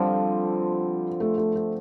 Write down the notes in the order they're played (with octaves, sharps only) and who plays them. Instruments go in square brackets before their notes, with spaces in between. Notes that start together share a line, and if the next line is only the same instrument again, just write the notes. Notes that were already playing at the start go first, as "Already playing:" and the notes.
Already playing: [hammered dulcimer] D3 F3 C4 F4 [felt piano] G3
[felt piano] A3
A3
A3